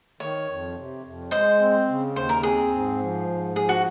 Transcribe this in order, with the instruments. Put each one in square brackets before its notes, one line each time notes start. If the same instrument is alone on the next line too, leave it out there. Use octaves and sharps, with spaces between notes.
[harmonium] D#3 [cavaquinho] C#5
[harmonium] F2
C3
F2
[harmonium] G#3 [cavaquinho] C5 D#5
[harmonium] C4
C#3
[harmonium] D#2 [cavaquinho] C5
[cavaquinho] A#4
[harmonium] C4 [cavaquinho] G#4
[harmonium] G#2
F3
G#2
[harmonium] F3 [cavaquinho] G#4
[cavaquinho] F#4